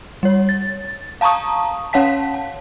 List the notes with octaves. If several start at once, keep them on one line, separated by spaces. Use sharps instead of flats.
G3 C#5
A6
F5 A5 A#5 C#6 D#6
C#4 C#5 F5 F#5 A5 B6
A5